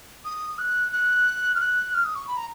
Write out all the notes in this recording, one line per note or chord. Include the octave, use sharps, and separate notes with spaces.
D#6
F#6
F#6
F6
F#6
F6
D#6
C#6
B5
A#5